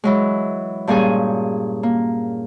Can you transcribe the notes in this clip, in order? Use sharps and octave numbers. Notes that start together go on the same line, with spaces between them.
E3 F#3 G#3
G2 A#2 G3 C#4 G#4 G#5
A#3